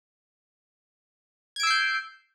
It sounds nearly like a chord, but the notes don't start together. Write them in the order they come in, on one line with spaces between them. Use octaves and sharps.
G#6 D7 E6 C7 G6